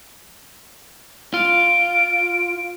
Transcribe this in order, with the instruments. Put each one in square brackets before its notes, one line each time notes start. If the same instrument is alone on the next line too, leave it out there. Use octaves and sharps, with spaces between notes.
[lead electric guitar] F4 [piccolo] D7